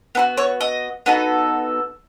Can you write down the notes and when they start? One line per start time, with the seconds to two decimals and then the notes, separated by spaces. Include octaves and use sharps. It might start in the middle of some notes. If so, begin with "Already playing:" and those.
0.15 B3 D#4 F#4
0.37 C#5
0.61 D#5
1.06 B3 D#4 F#4 A4